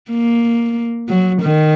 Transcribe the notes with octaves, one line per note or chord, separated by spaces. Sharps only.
A#3
F#3
D#3